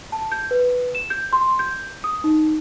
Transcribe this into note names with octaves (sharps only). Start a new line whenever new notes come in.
A5
G6
B4
E7
G6
C6
G6
D#6
D#4